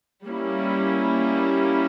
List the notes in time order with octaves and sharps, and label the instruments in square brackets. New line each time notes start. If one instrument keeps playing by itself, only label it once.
[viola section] G3 A#3 C#4 E4